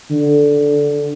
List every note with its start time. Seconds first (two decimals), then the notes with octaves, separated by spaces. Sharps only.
0.11 D3